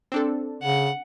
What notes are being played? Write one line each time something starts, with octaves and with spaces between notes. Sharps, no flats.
C4 D4 A4
C#3 F#5